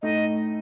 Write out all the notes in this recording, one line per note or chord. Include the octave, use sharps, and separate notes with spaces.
A2 A3 D#4 D#5